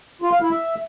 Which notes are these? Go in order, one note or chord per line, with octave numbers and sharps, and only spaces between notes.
F4
F5
E4
E5